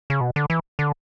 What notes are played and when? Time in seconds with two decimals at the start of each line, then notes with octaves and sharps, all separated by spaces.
0.10 C#3
0.21 B2
0.36 D3
0.50 E3
0.79 D3